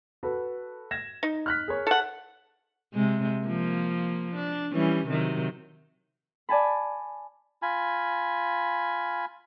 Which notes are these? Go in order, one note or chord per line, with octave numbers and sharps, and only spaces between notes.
F#4 A4 B4
G#6 A#6 E7
D#4
F6 F#6 B6
G#4 A#4 C#5
A4 F#5
C3 G#3
F3 A#3
D4
E3 G3 C#4
C3 D#3 F#3
D5 G#5 A5 B5
F4 G#5 B5